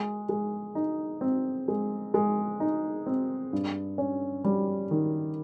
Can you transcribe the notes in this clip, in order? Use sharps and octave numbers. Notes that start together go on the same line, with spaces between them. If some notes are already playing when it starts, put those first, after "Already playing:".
Already playing: G#3
G#3
D#4
C4
G#3
G#3
D#4
C4
G2
C#4
G3
D#3